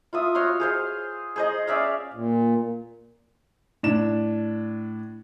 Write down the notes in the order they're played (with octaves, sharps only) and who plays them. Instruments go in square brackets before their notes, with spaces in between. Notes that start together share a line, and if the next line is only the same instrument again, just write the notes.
[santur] F4 E5 D#6
F#4 C#5 F5 C6
G#4 C5 F5
G#4 C5 D#5
C#4 D5 E5 F5
[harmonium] A#2
[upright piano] A2 D4 E7